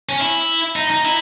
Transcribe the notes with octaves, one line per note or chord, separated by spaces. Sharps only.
C#4
E4
D#4
D#4
E4